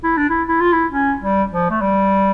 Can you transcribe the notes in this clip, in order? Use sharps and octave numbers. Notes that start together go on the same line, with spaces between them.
E4
D4
E4
E4
F4
E4
C#4
G3
F3
A3
G3